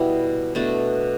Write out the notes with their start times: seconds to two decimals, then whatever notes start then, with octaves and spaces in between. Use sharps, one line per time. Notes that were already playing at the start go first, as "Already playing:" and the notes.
Already playing: B2 G3 B3 E4
0.55 B2 A3 D4